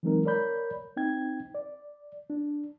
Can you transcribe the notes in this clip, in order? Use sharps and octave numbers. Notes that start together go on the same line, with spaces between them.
E3 F#3 G#3 C4 D#4 A#4
A#4 C#5 D5 B5 G6
C4 D#4 G5 G#6
D5
D4